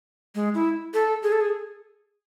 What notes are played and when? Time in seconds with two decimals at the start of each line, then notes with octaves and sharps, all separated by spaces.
0.35 G#3
0.55 E4
0.94 A4
1.23 G#4
1.32 A4
1.41 G#4